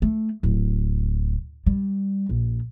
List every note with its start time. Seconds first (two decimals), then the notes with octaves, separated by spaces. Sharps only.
0.02 A3
0.43 D1
1.66 G3
2.29 A#1